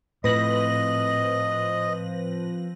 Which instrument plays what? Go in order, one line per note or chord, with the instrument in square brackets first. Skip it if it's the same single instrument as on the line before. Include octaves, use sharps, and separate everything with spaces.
[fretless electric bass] A2 [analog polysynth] F3 C4 [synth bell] B4 A#6 F#7 [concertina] D#5